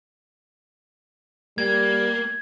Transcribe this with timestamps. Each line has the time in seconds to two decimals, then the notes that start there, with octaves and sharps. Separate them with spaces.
1.58 G3 A#3 G#6